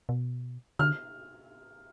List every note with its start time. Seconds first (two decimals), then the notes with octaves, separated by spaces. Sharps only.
0.09 B2
0.79 D3 F6